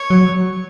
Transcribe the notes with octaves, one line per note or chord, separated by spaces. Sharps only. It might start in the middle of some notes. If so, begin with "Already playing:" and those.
Already playing: C#5
F#3